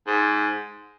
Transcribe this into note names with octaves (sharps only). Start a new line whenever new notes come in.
G#2